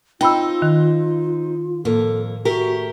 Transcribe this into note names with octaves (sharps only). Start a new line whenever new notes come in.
C4 D#4 F4 G5 B5 E6
D#3
F2 A2 A#3 A4
A3 F#4 G4 A#4